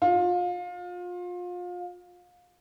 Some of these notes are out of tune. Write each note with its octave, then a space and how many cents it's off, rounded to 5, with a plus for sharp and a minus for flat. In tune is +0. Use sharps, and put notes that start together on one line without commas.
F4 +30